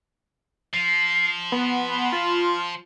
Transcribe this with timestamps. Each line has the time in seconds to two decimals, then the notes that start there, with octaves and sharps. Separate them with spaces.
0.73 F3 C7
1.52 B3 B5
2.12 F4